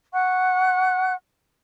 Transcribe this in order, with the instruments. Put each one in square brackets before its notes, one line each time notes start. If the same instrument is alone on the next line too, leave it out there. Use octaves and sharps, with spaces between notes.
[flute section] F#5 C#6 F#6